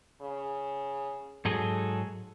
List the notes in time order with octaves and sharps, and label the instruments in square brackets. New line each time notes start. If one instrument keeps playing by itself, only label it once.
[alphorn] C#3
[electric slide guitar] G#2 F#3 G#4 [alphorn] A4